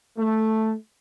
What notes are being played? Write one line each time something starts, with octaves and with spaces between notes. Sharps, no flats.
A3